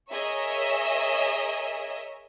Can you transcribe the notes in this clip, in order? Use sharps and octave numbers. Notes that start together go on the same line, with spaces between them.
G#4 A#4 C#5 D#5 E5